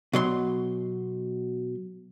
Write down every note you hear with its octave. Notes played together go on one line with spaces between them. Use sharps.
B2 F#3 C6